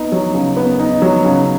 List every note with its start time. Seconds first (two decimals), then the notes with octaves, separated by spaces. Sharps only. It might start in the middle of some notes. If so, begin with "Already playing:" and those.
Already playing: B3 D#4
0.12 F#3
0.34 C#3
0.57 B3
0.79 D#4
1.02 F#3
1.24 C#3